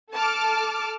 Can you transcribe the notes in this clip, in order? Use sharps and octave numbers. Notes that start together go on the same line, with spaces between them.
A4 A5 D6 F6